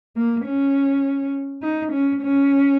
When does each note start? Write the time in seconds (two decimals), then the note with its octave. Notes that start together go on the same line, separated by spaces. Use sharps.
0.16 A#3
0.45 C#4
1.62 D#4
1.92 C#4
2.21 C#4